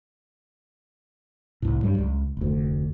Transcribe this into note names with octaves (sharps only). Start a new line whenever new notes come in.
C2 A2
G2 F#3 G3
C#2
F1 D2